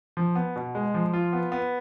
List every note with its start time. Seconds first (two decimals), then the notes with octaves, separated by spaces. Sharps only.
0.17 F3
0.36 B3
0.56 B2
0.75 G#3
0.94 F3
1.13 F4
1.33 B3
1.52 B3